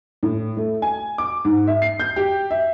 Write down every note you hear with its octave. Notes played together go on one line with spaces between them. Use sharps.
A2
A3
G#5
D6
G#2
E5
C7
G6
G4
E5